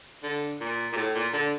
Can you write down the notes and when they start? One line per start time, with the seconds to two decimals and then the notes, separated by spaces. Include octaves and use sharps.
0.23 D3
0.60 A#2
0.93 A#2
0.97 A2
1.15 A#2
1.33 D3